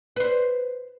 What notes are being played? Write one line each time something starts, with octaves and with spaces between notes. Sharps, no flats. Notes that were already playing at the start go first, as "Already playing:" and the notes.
B4 C5